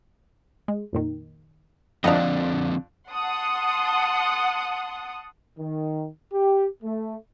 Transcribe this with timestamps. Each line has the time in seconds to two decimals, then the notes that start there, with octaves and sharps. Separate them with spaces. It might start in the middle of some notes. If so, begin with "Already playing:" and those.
0.68 G#3
0.93 F2 A#2 D#3
2.04 F2 D3 F3 C4 D4 D#5 F#5 A#5
3.11 F#5 A5 C6 D#6
5.59 D#3
6.32 G4
6.83 A3